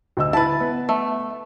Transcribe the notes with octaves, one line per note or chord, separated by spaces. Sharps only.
D2 D#5 E6
E4 B4 A5
B3
A3